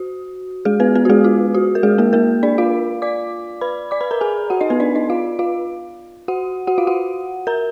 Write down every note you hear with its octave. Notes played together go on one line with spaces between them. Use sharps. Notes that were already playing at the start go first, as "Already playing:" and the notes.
Already playing: F#4
G#3 G#4
B3 B4
B3 B4
F#4
G#3 G#4
F4
F#4
A#4
G#3 G#4
A#3 A#4
A#3 A#4
D4 D5
F4 F5
D5 D6
B4 B5
D5 D6
B4 B5
A#4 A#5
G#4 G#5
F#4 F#5
D#4 D#5
B3 B4
D4 D5
D#4 D#5
F4 F5
F4 F5
F#4 F#5
F#4 F#5
F4 F5
F#4 F#5
A#4 A#5